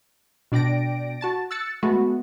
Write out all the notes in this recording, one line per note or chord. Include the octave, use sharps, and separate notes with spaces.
B2 D4 D5 G5 A#6 D7
F#4 A5 A6
E6 F#6 A6 C#7
G#3 A3 B3 F#4